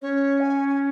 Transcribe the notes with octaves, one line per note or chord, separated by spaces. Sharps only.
C#4 C#5
G#5
G#5